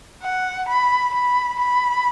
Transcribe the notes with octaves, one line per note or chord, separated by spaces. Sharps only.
F#5
B5
B5
B5